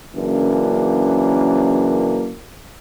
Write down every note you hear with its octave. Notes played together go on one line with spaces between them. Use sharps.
F#2 C#3 E3 A#3 D4